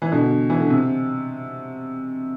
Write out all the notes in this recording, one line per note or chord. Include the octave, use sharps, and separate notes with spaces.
E3
B2 D3
E3
D3
C3